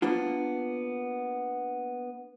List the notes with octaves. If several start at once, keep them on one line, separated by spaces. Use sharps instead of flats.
A#3 B3 D4 F4